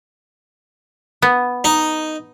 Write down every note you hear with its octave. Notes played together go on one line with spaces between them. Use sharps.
B3
D#4